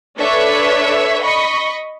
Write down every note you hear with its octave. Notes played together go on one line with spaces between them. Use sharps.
D4 A4 B4 C#5 E5
D#5 B5 C#6